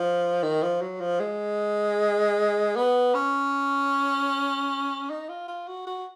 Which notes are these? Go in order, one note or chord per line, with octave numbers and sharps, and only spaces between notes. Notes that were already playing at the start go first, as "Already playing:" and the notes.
Already playing: F3
D#3
F3
F#3
F3
G#3
B3
C#4
D#4
F4
F4
F#4
F#4